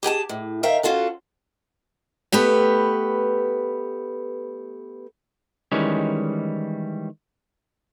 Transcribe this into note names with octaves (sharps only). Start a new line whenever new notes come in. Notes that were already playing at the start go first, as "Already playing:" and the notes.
G4 G#4 G5 A5
A2
D#3 A#4 E5 F5 G5
C#4 F4 F#4 A4 F#5
A3 B3 G4 B4
D#3 E3 G3 G#3 C#4